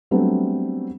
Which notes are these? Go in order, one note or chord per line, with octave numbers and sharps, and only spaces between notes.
F#3 G3 A3 B3 C4 D4